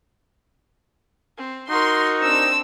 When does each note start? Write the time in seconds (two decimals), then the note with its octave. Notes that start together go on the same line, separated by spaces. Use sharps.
1.38 C4
1.70 D#4 F#4 A#4 C6
2.21 C4 D4 E6